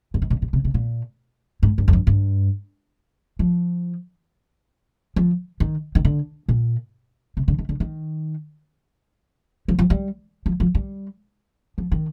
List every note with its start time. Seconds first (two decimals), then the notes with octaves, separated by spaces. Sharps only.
0.14 G2
0.22 G#2
0.30 A#2
0.42 A#2
0.53 C3
0.64 C3
0.74 A#2
1.63 G#2
1.78 G2
1.88 F2
1.93 G2
2.07 G2
3.39 F3
5.16 F3
5.60 D#3
5.95 D#3
6.05 D3
6.48 A#2
7.37 C3
7.48 D3
7.58 D#3
7.69 D3
7.80 D#3
9.68 F3
9.79 F3
9.90 G3
10.46 F3
10.60 F3
10.75 G3
11.78 F3
11.92 D#3